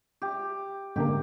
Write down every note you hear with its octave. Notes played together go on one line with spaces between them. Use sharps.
G4
G#2 D3 A#3 G4